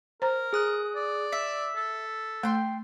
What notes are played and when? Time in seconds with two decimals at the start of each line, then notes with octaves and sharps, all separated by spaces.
0.22 A#4 C5 A#5
0.53 G#4 D#6 F#6
0.96 D5
1.32 E5 B6
1.76 A4
2.43 A3 G5 C6